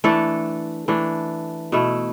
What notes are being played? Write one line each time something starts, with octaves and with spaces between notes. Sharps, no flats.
E3 A3 D4 A4
E3 A3 D4
B2 A3 E4